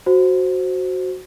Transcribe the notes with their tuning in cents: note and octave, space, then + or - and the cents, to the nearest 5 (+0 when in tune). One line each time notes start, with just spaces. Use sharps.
F#4 +0 C5 +0